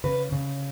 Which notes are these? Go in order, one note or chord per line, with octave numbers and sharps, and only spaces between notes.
C#3 B4
C#3